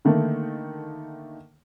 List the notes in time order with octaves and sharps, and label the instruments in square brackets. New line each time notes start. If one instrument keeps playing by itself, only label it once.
[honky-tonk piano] D3 D#3 A3 A#3